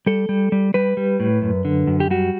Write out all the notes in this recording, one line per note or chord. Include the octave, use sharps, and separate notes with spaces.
G3 A4
G3
G3
G3 B4
G3
A2
F#2
D3
F#2
G4
G3 F#4